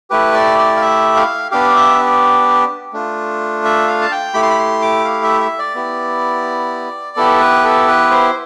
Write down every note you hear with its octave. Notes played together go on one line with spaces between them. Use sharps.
A3 E4 G4 B4
D5
D5
F5
E5
F5
B3 D4 G4 F5
E5
A3 D4 F4
E5
F5
A5
G5
A3 E4 G4 B5
C6
B5
C6
D6
F5
E5
E5
D5
B3 E4 G4
B3 E4 G4 A4
B4
A4
B4
C5